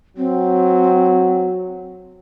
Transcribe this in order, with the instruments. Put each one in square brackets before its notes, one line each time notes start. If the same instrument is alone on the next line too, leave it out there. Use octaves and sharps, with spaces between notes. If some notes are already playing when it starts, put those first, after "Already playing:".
[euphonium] F#3 [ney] C4